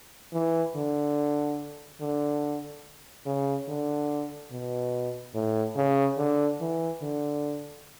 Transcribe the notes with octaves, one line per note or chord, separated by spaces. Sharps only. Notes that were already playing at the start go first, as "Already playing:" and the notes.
E3
D3
D3
C#3
D3
B2
A2
C#3
D3
E3
D3